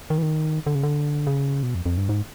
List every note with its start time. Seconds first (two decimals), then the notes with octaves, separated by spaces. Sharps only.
0.10 D#3
0.18 E3
0.22 D#3
0.66 D3
0.75 C#3
0.83 D3
1.27 C#3
1.63 B2
1.75 F2
1.86 F2
1.97 G2
2.09 G#2